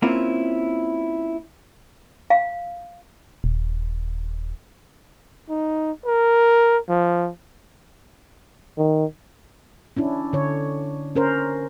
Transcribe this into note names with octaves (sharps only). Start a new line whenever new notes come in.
A#3 C4 C#4 E4 F4
F5
D#1
D#4
A#4
F3
D#3
C#4 D4 E4
D3 C#5
C#4 A#4 C5